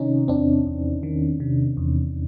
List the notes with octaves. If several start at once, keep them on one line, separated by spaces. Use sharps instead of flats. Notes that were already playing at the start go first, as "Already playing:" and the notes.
Already playing: C3 D#3 C#4 D#4
E2 C4 D4
E2
D#3
C3
E2